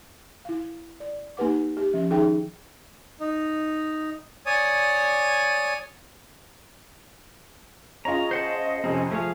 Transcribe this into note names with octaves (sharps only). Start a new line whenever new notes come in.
E4 F5
D5
A#3 D#4 G4 B4 F#5 D6
G4
F3 C#4 D4
D#3 D#4 G#4 E5 G5
D#4
C#5 D5 G#5 D#6
C#4 F4 G#4 D#5 A#5
C5 F#5 A5
F2 C3 C4 C#4
F3 A3 G#4 F5